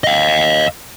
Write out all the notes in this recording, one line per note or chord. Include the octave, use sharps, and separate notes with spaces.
D#5 F5